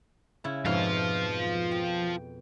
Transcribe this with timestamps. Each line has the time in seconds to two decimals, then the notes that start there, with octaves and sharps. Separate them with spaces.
0.44 C#3 E4
0.65 F2 G#2 B2 F3 F5
1.71 G5